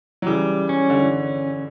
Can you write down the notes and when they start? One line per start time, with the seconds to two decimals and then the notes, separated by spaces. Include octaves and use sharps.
0.22 F#3
0.26 C#3 E3 G3
0.69 C#4
0.90 D3
1.00 E3